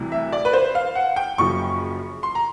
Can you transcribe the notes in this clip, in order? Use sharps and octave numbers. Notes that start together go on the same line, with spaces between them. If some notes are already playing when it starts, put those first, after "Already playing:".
Already playing: D2 C3 E3 G3
E5
D5
B4
C5
F5
F#5
G5
F#1 F#2 C#3 F3 C#6
C6
A#5